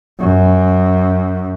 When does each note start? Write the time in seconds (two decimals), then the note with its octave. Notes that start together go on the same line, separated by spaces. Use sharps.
0.20 F#2